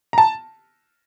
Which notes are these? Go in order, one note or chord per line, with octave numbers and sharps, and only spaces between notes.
A#5
A5